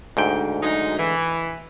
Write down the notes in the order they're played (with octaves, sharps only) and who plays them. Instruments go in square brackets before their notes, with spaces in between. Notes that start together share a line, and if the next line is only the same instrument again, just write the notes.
[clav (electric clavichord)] D2 G#2 G5
[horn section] F#3 G#3 D#4
E3